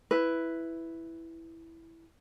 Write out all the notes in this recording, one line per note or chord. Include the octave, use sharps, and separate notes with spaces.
E4 B4